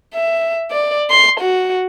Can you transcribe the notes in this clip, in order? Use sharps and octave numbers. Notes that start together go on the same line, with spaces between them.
E5
D5
C6
F#4